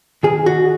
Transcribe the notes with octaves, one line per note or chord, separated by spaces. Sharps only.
D#3 G#4
F#4